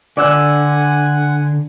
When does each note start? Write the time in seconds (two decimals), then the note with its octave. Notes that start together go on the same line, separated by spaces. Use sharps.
0.17 D3 D5 F#5 G#5 E6 F#6